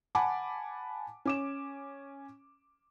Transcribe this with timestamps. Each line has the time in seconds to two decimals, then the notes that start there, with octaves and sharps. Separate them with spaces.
0.15 F#5 G#5 A5 B5 D6
1.25 C#4 D6 E7